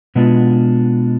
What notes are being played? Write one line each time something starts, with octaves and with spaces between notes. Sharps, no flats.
B2 G#3 B3 D4 F4